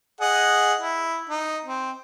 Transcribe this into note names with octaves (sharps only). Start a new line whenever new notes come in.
G#4 D#5 F#5
E4
D#4
C4